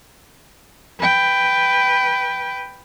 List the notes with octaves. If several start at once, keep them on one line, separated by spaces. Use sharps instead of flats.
B4 G5